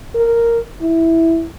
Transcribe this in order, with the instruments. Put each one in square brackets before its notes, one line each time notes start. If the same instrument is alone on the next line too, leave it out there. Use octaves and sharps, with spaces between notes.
[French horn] A#4
E4